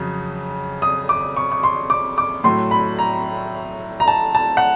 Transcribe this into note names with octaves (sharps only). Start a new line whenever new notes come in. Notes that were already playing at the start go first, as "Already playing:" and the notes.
Already playing: F2 C#3 F#3
D#6
D6
C#6
C#6
C6
D6
D6
A2 F#3 A3 C6
B5
A#5
A#5
A5
A5
F#5